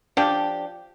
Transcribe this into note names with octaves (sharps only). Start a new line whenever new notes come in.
F3 D4 G4